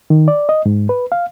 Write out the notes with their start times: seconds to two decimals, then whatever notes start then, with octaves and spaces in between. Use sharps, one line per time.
0.10 D#3
0.28 D5
0.49 D#5
0.66 G#2
0.89 B4
1.12 F5